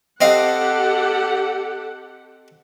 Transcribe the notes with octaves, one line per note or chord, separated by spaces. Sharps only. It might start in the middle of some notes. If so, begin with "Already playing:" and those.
C4 G4 A4 D#5 F5 F#5